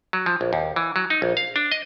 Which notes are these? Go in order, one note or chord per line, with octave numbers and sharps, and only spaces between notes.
F#3
F3
A#1
D#2
E3
F#3
D#4
A#1
F5
D4
D#5